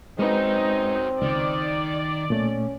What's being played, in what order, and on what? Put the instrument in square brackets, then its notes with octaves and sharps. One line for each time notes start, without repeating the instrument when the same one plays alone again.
[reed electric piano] G#3 B4 [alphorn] C4 [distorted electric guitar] C#4 F#4 [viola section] D#4
[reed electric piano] C#2 [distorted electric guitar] D#3 [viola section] D5
[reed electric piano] A#2 A3 [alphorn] C#4